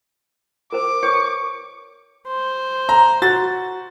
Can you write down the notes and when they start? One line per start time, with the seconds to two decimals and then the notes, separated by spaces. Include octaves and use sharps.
0.72 A#4 C5 D6
1.03 B4 C#5 C#6
2.27 C5
2.89 A#5
3.22 F#4 A6